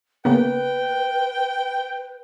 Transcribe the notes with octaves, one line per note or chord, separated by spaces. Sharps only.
C#3 A#3 B3 B4 G5